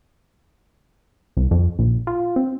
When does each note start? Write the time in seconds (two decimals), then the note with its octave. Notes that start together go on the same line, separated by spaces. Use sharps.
1.37 C2
1.51 F2
1.79 A#1
2.07 F4
2.36 C4